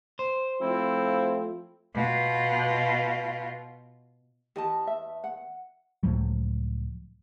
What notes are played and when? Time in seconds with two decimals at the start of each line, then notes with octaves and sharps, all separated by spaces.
0.19 C5
0.62 F3 A3 C4 E4 F4
1.94 B2 F4
4.56 E2 G4 D#5 A5
4.87 E5
5.24 F#5
6.03 C#2 A2 F3 F#3